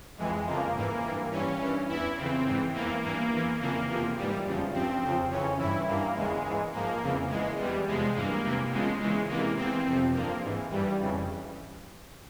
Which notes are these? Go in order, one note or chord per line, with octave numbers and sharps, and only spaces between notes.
F2 E3 G#3
F2 C#3 F3 A#3
G#2 E3 A#3
G2 E3
G2 E3 C#4
G2 E3
E2 E3 E4
F2 C#3 E3 C4
G#2 E3
E2 E3 A#3
G2 E3 A#3
E2 E3
F2 C#3 E3 A#3
E2 C3 F3
G#2 E3 G3
E2 C#3 F3
G2 F3 C4
F2 C#3 F3
F2 C#3 E3 C#4
G2 E3 E4
G2 E3 A#3
E2 C#3 E3 G#3
G#2 E3
G#2 F3 A#3
F2 C#3 E3
E2 E3 G#3
E2 E3 G3
E2 C3 F3 G#3
G2 E3 A#3
E2 C3 E3
E2 C#3 F3 G#3
E2 C#3 E3 G#3
E2 C3 E3 A#3
E2 E3 C4
F2 C3 F3
G2 F3 A#3
G#2 E3
G2 E3 G3
F2 C#3 E3